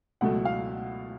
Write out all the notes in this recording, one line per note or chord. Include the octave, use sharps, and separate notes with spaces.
C#2 B2 F#3 A3 F#5
F5